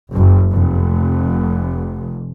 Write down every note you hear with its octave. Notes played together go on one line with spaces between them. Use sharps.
F#1
F1